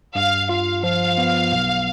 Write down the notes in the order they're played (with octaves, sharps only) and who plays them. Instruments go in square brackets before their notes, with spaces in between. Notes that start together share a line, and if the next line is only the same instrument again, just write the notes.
[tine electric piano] G2 [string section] F5
[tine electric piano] F4 [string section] F5
[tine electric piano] F3 [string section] F5
[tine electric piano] B3
B1